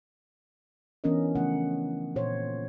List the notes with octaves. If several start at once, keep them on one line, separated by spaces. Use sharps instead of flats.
E3 B3 C#4 D4 A#4 D#5
C#3 F3 A3 F#5
A#2 C5 C#5